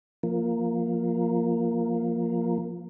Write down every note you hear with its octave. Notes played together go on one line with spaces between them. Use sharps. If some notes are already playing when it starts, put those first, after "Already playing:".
F3 A#3